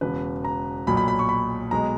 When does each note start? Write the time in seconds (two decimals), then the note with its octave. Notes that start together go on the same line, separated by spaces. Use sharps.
0.01 E1 E2 C#3 B4
0.45 A#5
0.87 B1 A#2 F#3 B5
0.97 B5
1.08 B5
1.19 C#6
1.29 B5
1.71 B1 B2 G#3 A#5